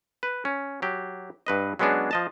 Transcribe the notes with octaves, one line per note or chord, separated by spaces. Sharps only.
B4
C#4
F#3 G4
G2 B4 D#5
F#3 G#3 B3 C#4 D4 G#4
F3 D#5 A5